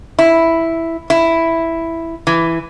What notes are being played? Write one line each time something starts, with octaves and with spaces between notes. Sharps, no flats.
E4
E4
E3